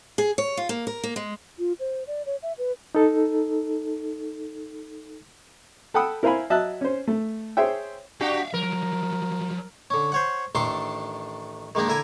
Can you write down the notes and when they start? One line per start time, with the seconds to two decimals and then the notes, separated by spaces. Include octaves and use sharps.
0.18 G#4
0.38 C#5
0.57 F4
0.69 A#3
0.87 A#4
1.04 A#3
1.16 G#3
1.59 F4
1.80 C5
2.07 D5
2.26 C#5
2.42 E5
2.58 B4
2.95 D#4 A4
5.94 A4 F#5 G5 B5 D#6 E6
6.23 E4 A#4 C5 F5 G#5 B5
6.50 F#3 D#5 E5 A5 F#6
6.81 C#4 C5
7.07 A3
7.57 G#4 C5 C#5 E5 G5
8.21 D4 F#4 G4 E5 F5
8.54 F3 F#3 A#4
9.90 D3 C#4
10.12 C5 C#5 F#5
10.55 A1 D#3 D4 A4 A5 C6
11.75 D#3 G#3 A#3 D4 D#4
11.88 D3 E4 A#4 E5 G#5